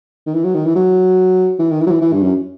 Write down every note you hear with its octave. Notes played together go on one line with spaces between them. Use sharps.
D#3
E3
F#3
D#3
E3
F#3
E3
D#3
E3
F#3
E3
E3
G2
F#2